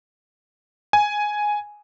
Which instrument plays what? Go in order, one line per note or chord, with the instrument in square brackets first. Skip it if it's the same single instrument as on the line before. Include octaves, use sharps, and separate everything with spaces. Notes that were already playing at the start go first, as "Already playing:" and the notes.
[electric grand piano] G#5